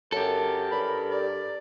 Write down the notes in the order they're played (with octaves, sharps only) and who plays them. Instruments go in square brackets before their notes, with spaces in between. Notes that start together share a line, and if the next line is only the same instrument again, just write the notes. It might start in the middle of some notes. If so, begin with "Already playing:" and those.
[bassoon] F#2 [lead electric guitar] G4 A4 [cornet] A#4
[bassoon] G2 [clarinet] B5
[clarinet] D5